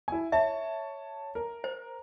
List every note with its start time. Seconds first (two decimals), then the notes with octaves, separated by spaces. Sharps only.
0.08 E4 G#5
0.32 C#5 E5 A5
1.35 A#4
1.64 C5